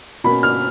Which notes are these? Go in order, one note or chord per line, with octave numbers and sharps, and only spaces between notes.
B2 A#3 C#4 B5
F6